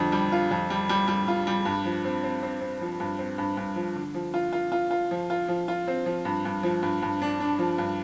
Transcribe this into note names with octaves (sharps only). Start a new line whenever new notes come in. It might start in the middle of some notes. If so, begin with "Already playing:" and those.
Already playing: F2 D3 G3
G3
F4
F2
G3
G3
G3
F4
G3
G2
F3
C4
C4
C4
C4
F3
G2
C4
G2
G2
F3
D3
F3
F4
F4
F4
F4
F3
F4
F3
F4
C4
F3
G2
G2
F3
G2
G2
D4
D4
F3
G2